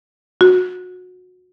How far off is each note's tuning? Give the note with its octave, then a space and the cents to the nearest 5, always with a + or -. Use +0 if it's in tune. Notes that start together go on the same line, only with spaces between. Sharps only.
F#4 -25